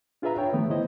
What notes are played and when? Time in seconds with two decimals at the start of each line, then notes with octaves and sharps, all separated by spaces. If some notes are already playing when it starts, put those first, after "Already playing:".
0.22 D4 F4 G#4 B4 E5 A#5
0.38 C#5 G5
0.53 D3 D#3 F3 A3 B3
0.70 E4 C5 D#5